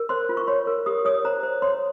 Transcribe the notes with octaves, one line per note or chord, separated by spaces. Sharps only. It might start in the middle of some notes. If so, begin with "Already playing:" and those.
Already playing: A#4
C5 C6
F4
C#6
C#5 C6
A#4
G4 D#6
C#5 D#6
C5 A#5
C5
C#5 C6